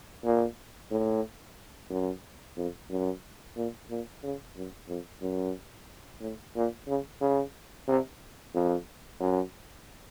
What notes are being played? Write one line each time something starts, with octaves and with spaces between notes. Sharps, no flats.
A#2
A2
F#2
F2
F#2
A#2
A#2
C#3
F#2
F2
F#2
A2
A#2
C#3
C#3
C3
F2
F#2